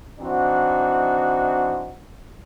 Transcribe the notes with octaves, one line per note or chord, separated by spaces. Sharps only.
E3 C4 D4 D#4 F#4